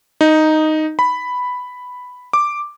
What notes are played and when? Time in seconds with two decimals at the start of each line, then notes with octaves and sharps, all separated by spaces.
0.21 D#4
0.99 B5
2.33 D6